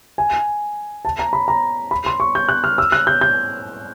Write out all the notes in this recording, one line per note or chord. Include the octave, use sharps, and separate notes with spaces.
G#5
A5
A#5
B5
A#5
B5
C6
C#6
G6
F#6
F6
E6
F#6
G6
G6